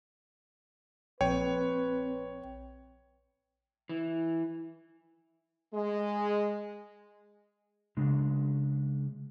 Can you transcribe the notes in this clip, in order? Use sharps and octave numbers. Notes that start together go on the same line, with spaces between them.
A#1 C4 B4 C#5 G5
E3
G#3
C#3 G#3 D4